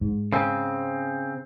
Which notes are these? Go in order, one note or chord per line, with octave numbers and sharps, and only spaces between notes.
G#2
C#3 C4